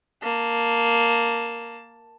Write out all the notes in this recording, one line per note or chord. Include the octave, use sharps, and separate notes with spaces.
A#3 A5